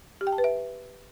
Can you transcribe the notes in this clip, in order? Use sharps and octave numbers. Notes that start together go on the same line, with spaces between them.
G4
G5
A5
B4
E5